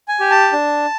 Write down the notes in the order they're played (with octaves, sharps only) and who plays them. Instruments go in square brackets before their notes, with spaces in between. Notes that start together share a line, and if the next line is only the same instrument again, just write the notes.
[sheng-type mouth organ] G#5
G4
A5
D4